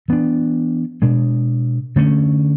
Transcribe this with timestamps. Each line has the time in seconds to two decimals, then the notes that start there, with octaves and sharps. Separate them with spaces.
0.08 E3 B3 D4
1.02 B2 G#3 D4
1.96 D3 A3 C#4